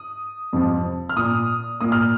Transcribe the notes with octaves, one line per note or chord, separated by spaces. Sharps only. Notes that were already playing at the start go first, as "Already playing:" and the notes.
Already playing: D#6
F2 C3 F3
F6
A#2 A#3 D#6
A#2 A#3 D#6
F6